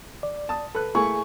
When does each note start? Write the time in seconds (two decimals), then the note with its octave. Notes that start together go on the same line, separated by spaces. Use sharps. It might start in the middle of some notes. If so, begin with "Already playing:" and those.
0.23 D5
0.49 A5 D#6
0.75 A4 B4 F#6
0.95 A3 A#3 E4 G#4 G#5 C#6